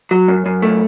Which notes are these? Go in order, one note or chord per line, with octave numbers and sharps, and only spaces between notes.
F#3
F#2
F#2
A3